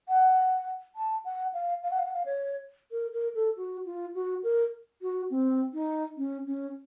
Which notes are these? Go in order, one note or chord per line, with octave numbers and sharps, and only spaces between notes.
F#5
A5
F#5
F5
F5
F#5
F5
F#5
F5
C#5
A#4
A#4
A4
F#4
F4
F#4
A#4
F#4
C4
D#4
C#4
C#4